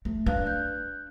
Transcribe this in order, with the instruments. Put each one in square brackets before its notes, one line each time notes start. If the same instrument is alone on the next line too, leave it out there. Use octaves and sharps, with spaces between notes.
[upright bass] A3
[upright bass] D4 [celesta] B4 F5 F#6
[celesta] F#6 G6